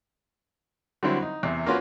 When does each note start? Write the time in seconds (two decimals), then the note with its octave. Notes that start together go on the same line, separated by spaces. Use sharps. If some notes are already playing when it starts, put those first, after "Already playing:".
1.03 D3 F#3 G3 C4 E4
1.22 D#4
1.43 E2 C3
1.66 A#3 C4 C#4 F4 F#4 B4